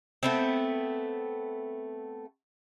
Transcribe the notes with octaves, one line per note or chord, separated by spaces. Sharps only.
A3 B3 C4